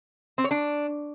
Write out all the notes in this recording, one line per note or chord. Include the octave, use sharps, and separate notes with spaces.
C4
C#5
D4